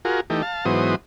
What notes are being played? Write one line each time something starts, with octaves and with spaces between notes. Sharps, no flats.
F4 F#4 G#4 A#4
E3 A3 D#4 G4
F5 A5
G#2 E3 F#3 B3 C5 D#6